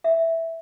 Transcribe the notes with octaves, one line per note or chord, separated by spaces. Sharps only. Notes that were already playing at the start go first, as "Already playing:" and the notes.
E5